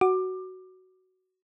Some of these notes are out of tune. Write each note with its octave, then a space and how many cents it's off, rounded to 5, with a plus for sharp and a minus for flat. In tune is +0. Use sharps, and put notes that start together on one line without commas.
F#4 +10 D6 +20